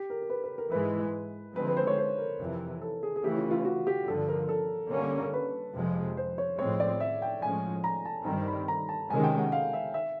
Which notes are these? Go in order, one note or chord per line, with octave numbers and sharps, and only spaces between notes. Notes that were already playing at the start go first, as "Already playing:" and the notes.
Already playing: G4
A#4
A#4
B4
B4
A#4
G#2 E3 G#3 B4
D3 F3 G#3 C4 B4
B4
C5
C#5
C5
A#4
F2 C3 E3
A4
G#4
G#4
C#3 E3 A3 C#4 G4
F4
F4
F#4
G4
G2 D3 F3 A4
A#4
A4
D3 G3 A#3 C#4
B4
F2 C3 F3 G#3
C5
C#5
A2 F3 G#3 C4 C#5
D5
E5
G5
A2 F3 G#3 C#4 G#5
A#5
A5
G2 D#3 G3 C4 A#5
B5
A#5
A5
C3 D#3 G#3 C#4 G#5
G5
F#5
F5
E5
E5